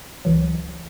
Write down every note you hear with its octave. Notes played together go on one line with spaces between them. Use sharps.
C#2 E3 F#3